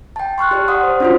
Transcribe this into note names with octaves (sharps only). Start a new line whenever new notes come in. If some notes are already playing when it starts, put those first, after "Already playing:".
G5 A5
C6 C#6 F6 F#6
G4 D5
D5 F#5 C6 D#6
C5
C#4 D4 F4 F#4 C5